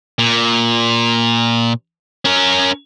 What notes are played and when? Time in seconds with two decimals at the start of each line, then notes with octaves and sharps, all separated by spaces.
0.19 A#2
2.25 C#4 A#4